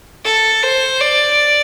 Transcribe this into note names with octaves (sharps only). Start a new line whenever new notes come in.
A4
C5
D5